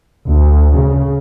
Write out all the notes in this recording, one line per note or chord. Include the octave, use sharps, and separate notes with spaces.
D2
C#3